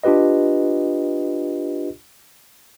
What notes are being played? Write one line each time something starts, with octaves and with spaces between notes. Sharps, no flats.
D4 F4 G4 B4 D#5